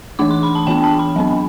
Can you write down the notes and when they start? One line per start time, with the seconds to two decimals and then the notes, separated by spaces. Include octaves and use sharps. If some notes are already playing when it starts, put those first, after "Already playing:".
0.19 E3 A3 D4 D6
0.31 C6
0.43 B5
0.55 A5
0.67 E3 B3 D4 G5
0.84 A5
0.99 B5
1.16 F#3 B3 D4